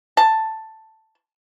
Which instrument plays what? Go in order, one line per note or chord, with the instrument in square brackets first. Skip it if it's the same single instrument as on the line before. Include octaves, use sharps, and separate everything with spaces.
[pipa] A5